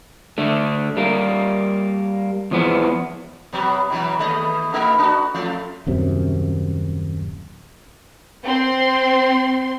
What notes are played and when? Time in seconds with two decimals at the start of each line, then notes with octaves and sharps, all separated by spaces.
0.38 D3 A3
0.97 G3 A#3
2.51 E2 F3 B3
3.53 B2 F#3 B3
3.90 B2 E3 F#3
4.19 D#2 A3 D#5
4.73 B2 A3 D#4
4.99 D4 F#4
5.34 F2 A3 F4
5.87 D#1 F#2 C3
8.44 C4 C6